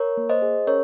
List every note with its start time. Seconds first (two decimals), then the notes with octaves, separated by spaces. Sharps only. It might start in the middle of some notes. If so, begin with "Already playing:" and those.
Already playing: A#4 C#5
0.17 A#3
0.29 C5 D#5
0.42 G#4
0.67 C#4 A#4 C#5